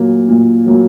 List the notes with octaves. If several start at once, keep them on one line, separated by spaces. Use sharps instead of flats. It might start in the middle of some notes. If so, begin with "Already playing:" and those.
Already playing: A#2 F#3 A#3
A#2
F#3 A#3